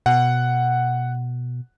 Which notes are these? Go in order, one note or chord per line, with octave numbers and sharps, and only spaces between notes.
B2 F#5